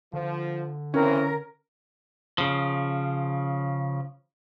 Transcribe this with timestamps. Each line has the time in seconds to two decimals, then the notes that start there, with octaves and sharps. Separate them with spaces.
0.13 D3 F3
0.94 C#3 E3 C4 C#4 A#4
2.38 C#3 F3